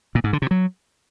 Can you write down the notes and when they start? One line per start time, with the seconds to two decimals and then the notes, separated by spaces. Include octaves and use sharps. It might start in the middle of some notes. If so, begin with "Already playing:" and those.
0.15 A#2
0.24 G#2
0.33 D3
0.42 C3
0.51 F#3